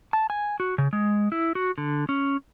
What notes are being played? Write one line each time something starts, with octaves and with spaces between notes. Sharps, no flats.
A5
G#5
F#4
C#3
G#3
E4
F#4
D3
C#4